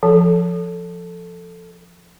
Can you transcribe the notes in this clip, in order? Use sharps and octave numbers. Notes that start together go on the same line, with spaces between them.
F3 A4